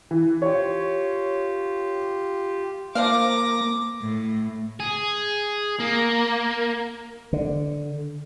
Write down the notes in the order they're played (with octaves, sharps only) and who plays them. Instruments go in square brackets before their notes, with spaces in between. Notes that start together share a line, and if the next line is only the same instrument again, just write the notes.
[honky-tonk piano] E3
[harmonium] F4 G4 [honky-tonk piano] C#5
[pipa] F3 D5 F5 [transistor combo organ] A#3 [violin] D6 A#6
[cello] A2
[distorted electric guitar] G#4
A#3
[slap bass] D3